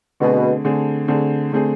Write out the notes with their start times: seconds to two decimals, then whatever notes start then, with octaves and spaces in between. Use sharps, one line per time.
0.20 B2 D3 A3 C4 G#4
0.65 D3 A3 C4 G#4
1.08 D3 A3 C4 G#4
1.53 D3 A3 C4 G#4